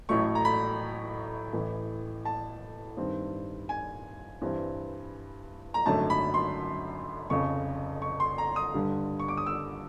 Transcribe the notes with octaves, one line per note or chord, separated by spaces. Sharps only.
A1 A2 F#3 A3 C#6
A#5
B5
A1 A2 E3
A5
G2 D#3 G3 C4
G#5
G2 E3 G3 C4
A#5
G#1 F#2 D3 F#3 A3 A5
B5
C6
F1 F2 C#3 C#6
C#6
C6
A#5
D#6
G2 D3 G3
C#6
D6
D#6
E6